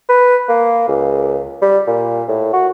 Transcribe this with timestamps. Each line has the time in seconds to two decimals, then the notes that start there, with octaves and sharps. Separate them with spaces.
0.09 B4
0.49 A#3
0.88 C#2
1.62 G3
1.87 A#2
2.28 A2
2.53 F#4